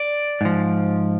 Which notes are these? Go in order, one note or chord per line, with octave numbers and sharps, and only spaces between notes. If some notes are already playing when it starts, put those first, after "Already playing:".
Already playing: D5
G#2 F3